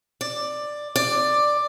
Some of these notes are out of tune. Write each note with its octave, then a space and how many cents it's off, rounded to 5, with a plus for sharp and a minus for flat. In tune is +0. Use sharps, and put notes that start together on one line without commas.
D5 +10
D5 +10